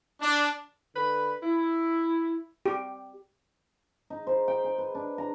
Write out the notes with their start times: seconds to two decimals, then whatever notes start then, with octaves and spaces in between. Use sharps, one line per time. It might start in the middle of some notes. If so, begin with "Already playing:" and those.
0.22 D4
0.96 D3 B4 B5
1.43 E4
2.66 G4
4.10 D#4
4.27 C5
4.48 G5
4.64 G#5
4.78 B4
4.95 D4
5.18 A#5